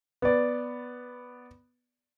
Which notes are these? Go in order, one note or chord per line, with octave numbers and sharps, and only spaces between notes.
B3 D5